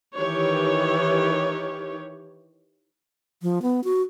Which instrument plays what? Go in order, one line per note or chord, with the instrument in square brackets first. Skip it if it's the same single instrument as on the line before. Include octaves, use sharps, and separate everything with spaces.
[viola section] D#3 E3 G4 C#5
[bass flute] F3
B3
F#4